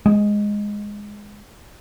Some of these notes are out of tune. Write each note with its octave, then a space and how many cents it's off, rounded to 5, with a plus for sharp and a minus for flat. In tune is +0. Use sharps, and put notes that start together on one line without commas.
G#3 -5